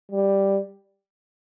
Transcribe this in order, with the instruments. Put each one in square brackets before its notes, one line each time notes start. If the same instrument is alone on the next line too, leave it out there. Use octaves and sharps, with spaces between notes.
[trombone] G3